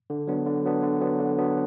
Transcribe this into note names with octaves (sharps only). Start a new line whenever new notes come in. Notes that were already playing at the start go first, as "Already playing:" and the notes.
D3
F#3 B3 D4
D3
F#3 B3 D4
D3
F#3 B3 D4
D3
F#3 B3 D4